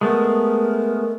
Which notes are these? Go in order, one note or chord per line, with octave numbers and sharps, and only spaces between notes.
G#3 A3 B3 A#4